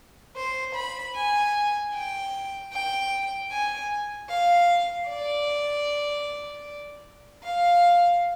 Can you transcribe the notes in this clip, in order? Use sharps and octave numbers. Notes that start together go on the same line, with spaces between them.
C5
B5
G#5
G5
G5
G#5
F5
D5
F5